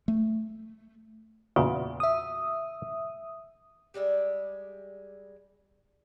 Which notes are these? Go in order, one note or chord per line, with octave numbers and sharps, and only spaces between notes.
A3
E2 A#2 C#3 F#4
E5 D#6
G3 G#3 D5 E5